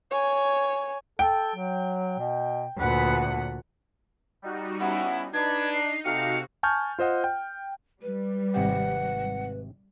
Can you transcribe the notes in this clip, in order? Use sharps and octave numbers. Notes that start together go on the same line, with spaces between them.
C#5 G#5
A4 G5
F#3
B2
D2 A#2 B4 F#5
G3 D#4 F#4
B3 C#4 E4 F#5
D4 D#4 B4 G#6
C7
C3 D#4 F#4 G4 A4 F5 C#7
G#5 A5 C#6 F6 G6
F4 C5 D#5 F#5
G5
G3 B4
G#1 C3 G4 F#5